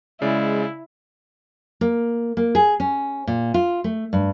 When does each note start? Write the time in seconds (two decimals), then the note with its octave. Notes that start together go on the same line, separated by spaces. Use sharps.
0.22 C#3 G#3 E4 D5
1.81 A#3
2.37 A#3
2.55 G#4
2.80 C#4
3.27 A#2
3.54 F4
3.84 A3
4.13 G2